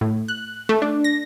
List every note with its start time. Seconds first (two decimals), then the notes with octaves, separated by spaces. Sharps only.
0.01 A2
0.28 F#6
0.69 A3
0.82 D4
1.04 A#6